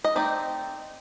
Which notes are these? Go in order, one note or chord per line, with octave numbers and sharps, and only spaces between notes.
D#5
A3 C4 D#4 D5